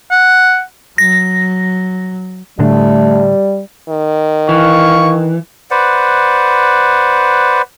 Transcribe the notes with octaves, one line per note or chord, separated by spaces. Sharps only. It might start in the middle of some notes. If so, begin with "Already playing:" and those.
F#5
F#3 A#6
A2 D3 G3 A3 D4
D#3
E3 F5 C#6
B4 C5 D5 F#5